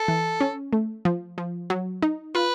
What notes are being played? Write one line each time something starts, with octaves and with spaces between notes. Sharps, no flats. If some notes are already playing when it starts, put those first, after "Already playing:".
Already playing: A4
E3
C#4
A3
F3
F3
F#3
D#4
F4 B4